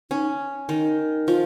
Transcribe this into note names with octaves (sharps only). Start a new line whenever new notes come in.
C#4 D#4
D#3 D#4
F3 F4